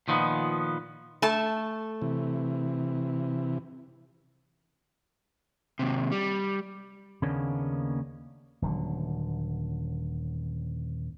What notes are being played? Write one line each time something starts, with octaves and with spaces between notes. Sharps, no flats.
A#2 D#3 F3 B3
A3 A5
C3 E3
D#2 C3
G3
D#2 C#3 A#3 B3 C#4 D4
D#1 D3 F#3